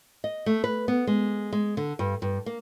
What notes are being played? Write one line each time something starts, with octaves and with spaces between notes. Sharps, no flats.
D#5
A3
B4
B3
G#3
G#3
D3
G2
G2
A#3